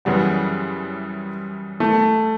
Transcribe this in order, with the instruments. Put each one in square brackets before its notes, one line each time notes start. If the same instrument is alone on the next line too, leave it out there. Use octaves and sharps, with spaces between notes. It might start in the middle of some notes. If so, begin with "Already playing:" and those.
[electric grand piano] F#2 C#3 E3 G3 [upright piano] B3
[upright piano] A3